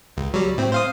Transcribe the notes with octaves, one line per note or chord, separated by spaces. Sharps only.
C#2
F#3 G3
A2 C4
C5 F5 D#6